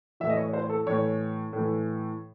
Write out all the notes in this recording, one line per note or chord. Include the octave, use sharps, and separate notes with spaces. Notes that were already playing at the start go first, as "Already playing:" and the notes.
A2 E3 E5
D#5
C#5
C5
A4
A2 E3 C#5
A2 E3